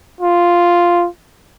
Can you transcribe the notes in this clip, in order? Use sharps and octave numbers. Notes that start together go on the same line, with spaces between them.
F4